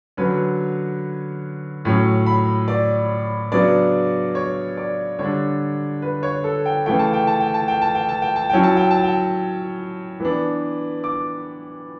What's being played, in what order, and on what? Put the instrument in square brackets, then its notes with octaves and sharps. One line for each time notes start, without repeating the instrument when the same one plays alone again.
[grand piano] D3 F#3 C#4 B4
A2 F#3 C#4
B5
D5
C#3 F#3 B3 D4 D5
C#5
D5
D3 G3 D4 C#5
B4
C#5
A4
G5
C#3 E3 A3 G5
A5
G5
A5
G5
A5
G5
A5
G5
A5
G5
A5
F#3 C#4 E4 G5
A5
G5
A5
G5
E3 B3 D4
D6